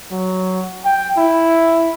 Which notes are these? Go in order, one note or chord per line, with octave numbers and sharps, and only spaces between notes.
F#3
G5
E4